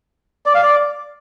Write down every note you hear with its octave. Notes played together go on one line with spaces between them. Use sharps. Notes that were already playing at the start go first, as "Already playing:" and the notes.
D5
F5
D5